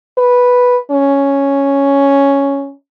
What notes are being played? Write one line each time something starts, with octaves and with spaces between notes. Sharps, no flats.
B4
C#4